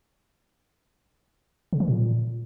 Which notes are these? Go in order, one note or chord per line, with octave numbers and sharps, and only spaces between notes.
C#3
E3
A#2